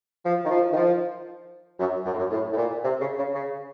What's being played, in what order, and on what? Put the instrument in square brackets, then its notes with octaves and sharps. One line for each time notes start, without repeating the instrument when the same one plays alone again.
[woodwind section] F3
D#3
F3
D#3
F3
F#2
F#2
A2
F#2
A2
A2
A#2
C3
C#3
C#3
C#3